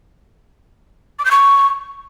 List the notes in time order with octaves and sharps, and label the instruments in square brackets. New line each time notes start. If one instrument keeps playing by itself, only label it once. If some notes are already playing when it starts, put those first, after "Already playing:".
[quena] D6
G6
C#6